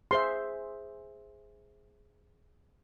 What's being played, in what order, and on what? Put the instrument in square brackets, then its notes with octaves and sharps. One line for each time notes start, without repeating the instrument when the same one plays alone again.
[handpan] G#4 C5 E5 [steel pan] C6